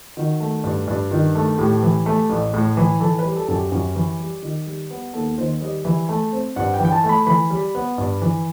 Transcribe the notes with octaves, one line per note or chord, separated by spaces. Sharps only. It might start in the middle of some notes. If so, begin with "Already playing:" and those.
D#3 F#4
A3
G2
G2
D#3
A3
A2 G4
E3
A3
A1
A2
E3
E3 A4
B4
G3
A4
F#2 A4
G4
F#2
E3
G3
D#3
G3
B3
D#2 A4
D#3 C5
G3 D#5
E3 E5
A3
C4
G2 F#5
G5
E3
G5
A5
A3
B5
E3 B5
G3
B3
G2
E3